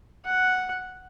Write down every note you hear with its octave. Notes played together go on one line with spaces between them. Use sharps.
F#5